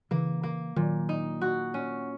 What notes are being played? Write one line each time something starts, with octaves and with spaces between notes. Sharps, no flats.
C#3 E3 A#3
A#3
A#2 D#3 F#3
D#4
F#4
C#4